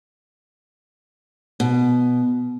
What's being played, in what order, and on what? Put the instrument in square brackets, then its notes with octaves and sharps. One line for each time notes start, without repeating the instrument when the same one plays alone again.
[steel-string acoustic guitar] B2